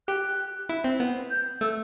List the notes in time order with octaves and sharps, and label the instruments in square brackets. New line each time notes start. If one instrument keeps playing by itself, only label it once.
[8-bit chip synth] G4 [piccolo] F#6
[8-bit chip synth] E4
C4
B3
[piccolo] G6
[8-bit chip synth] A3 [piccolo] E6